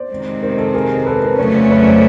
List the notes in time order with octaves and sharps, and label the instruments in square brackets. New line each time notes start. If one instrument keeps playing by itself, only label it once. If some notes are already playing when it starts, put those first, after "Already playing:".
Already playing: [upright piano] C5 D5
[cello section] C3 D#3 G#3 C4
[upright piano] A#4 C5
A4
G#4 A#4
A4 B4
A#4 C5
[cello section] F2 C#3 F#3 A3 C#4 [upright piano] B4 C#5
[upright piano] C5 D5
B4 C#5
C5 D5